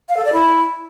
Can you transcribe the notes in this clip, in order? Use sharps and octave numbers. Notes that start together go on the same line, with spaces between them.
F5
A4
D5
E4